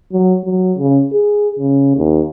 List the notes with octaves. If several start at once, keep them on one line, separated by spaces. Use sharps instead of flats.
F#3
F#3
C#3
G#4
C#3
D#2